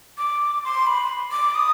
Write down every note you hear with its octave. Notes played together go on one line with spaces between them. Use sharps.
D6
C6
B5
D6
D#6